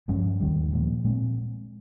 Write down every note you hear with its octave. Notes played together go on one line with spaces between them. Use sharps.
G2 F3 G#3 C#4
D#2 D#3 G3
A#2 F3 G#3
A#2 G#3 C4